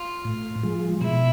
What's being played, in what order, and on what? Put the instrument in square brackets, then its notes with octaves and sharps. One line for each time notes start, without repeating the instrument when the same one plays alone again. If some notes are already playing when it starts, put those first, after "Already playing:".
Already playing: [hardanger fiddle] F4
[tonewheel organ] A2
F3 G#3
[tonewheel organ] B2 [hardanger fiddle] E4